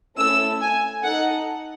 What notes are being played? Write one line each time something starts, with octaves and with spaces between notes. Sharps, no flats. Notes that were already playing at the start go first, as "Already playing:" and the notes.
A3 C#4 E4 A4 E6
G#5
D#4 A4 F#5